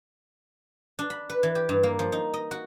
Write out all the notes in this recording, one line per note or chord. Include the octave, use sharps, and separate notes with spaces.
D4
B5
B4
E3
G4
G2
A#3
F3
D#4
D#5
F#4